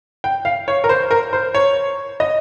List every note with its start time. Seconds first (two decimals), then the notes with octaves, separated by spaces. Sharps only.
0.24 G5
0.45 F5
0.68 C#5
0.84 A#4
0.89 C5
1.11 A#4
1.33 C5
1.54 C#5
2.20 D#5